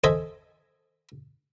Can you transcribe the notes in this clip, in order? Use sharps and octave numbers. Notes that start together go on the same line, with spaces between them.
A4 C5 D#5 E5 G#5